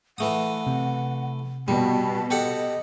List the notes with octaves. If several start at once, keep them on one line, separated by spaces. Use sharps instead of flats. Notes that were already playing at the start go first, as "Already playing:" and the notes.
E3 A3 F#5 D#6
C3
B2 G3 A5
G4 A4 D#5 F#5